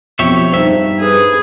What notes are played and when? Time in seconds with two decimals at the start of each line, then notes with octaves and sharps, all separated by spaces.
0.19 B1 F2 G4 C#5 E5
0.52 G2 D#4 C5 E5
0.99 G#4 B4